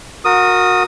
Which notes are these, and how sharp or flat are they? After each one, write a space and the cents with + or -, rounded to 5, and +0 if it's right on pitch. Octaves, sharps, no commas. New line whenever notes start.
F#4 -25 A#4 +0 D#6 +0